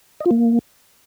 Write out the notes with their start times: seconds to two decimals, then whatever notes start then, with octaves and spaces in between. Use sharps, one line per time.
0.20 D#5
0.26 F4
0.31 A#3